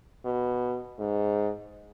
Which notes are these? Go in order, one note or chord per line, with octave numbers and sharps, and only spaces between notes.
B2
G#2